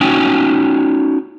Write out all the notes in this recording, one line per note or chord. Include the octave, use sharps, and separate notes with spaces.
C#4 D#4 F#4 G5 G#5